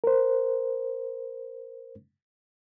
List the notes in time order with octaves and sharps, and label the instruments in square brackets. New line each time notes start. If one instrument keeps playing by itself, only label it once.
[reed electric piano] A#4 C5